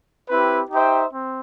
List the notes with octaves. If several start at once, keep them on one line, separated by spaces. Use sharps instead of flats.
C4 E4 G4 B4
D#4 G4 C5 E5 G5
C4